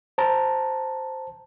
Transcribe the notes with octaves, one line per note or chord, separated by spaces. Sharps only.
C5 A5 A#5